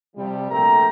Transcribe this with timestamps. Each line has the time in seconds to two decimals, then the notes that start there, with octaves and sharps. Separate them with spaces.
0.16 C3 F3 G3
0.50 A#1 A3 A#4 G5 A#5